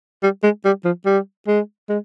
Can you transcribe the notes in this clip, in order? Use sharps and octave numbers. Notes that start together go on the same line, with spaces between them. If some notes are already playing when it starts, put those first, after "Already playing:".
G3
G#3
G3
F3
G3
G#3
G#3